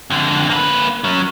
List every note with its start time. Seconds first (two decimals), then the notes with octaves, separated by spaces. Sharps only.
0.10 F2 D3
0.50 A#3 B4
1.04 F#3 C#4